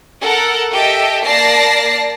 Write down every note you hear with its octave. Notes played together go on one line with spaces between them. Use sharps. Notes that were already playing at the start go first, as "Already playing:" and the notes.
A4 A#4 F#5
G4 A4 D#5 E5 G5
A#3 D5 A5 A#6 C7